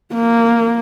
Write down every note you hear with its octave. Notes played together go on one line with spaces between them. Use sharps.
A#3